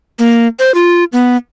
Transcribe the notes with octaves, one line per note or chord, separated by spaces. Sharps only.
A#3
C5
F4
B3